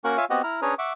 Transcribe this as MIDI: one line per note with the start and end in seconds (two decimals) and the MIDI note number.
0.04 0.17 58
0.04 0.17 61
0.04 0.17 66
0.04 0.17 70
0.04 0.17 78
0.04 0.17 85
0.17 0.25 65
0.17 0.25 73
0.17 0.25 76
0.17 0.25 77
0.17 0.25 80
0.30 0.42 59
0.30 0.42 60
0.30 0.42 66
0.30 0.42 67
0.30 0.42 75
0.30 0.42 78
0.43 0.60 64
0.43 0.60 82
0.43 0.60 89
0.62 0.74 61
0.62 0.74 62
0.62 0.74 68
0.62 0.74 71
0.62 0.74 73
0.62 0.74 82
0.79 0.93 76
0.79 0.93 78
0.79 0.93 85
0.79 0.93 86